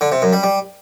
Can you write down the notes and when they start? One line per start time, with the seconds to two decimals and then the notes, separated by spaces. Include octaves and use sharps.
0.01 D3
0.12 C3
0.22 F#2
0.33 G3
0.43 G3